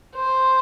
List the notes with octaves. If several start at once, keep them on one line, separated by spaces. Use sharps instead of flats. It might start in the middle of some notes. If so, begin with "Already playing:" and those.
C5